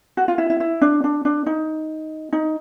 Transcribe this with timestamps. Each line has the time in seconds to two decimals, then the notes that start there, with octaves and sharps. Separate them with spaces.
0.17 F#4
0.28 F4
0.38 E4
0.50 E4
0.60 E4
0.82 D4
1.04 D4
1.25 D4
1.46 D#4
2.33 D#4